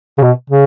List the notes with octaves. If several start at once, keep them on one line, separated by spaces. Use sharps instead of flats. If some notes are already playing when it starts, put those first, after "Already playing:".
C#3
B2
C#3